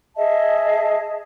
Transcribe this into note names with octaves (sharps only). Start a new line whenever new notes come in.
G#4 D#5 E5 A5